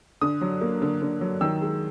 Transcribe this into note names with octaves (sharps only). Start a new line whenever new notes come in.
D3 D#6
F#3
A#3
D3
D3
F#3
D#3 E6
G#3